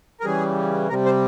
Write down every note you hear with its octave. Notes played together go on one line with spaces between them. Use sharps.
A#4
C#3 E3 G3 G#4
C3 G3 A#4
C5